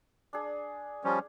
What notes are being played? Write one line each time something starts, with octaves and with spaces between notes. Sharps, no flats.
D4 G#4
F3 G3 C#4